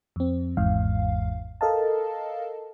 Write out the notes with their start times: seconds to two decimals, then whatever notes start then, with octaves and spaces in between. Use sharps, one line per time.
0.16 F2 C4
0.57 G#1 E2 G#2 F5
1.61 A4 A#4 D#5 F5 A5